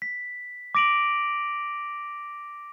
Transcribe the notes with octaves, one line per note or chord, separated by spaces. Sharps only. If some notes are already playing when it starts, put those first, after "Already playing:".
B6
D6 A#6 D7 F7 F#7